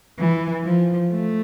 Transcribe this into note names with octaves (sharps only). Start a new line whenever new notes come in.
E3
F3
A3